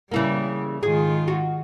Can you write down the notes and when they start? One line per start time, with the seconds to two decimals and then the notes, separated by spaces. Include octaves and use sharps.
0.11 C#3 E3 G3 A#3
0.83 G#2 D#3 F4 G#4
1.28 F#4